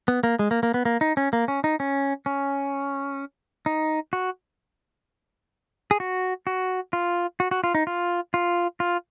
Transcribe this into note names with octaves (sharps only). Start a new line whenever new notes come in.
B3
A#3
G#3
A#3
A#3
B3
A#3
D#4
C#4
A#3
C#4
D#4
C#4
C#4
D#4
F#4
G#4
F#4
F#4
F4
F#4
F#4
F4
D#4
F4
F4
F4